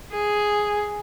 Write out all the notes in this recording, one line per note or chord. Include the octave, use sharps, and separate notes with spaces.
G#4